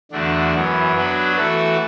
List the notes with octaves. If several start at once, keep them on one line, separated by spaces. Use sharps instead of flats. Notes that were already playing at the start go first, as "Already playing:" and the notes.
E2 D3 A3 D4 F#4
F#2 E3 B3
F#3 B3 D4 F#4 B4
E3 A3 F#4 A4